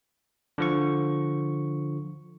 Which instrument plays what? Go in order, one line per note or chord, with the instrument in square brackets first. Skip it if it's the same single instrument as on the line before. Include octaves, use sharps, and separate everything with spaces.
[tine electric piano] D3 F3 C#6